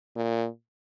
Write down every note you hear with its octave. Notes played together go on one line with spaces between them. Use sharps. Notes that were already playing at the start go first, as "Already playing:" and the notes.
A#2